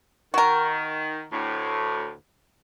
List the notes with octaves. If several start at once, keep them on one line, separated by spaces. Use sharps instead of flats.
D#3 F#4 A#4
D2 A2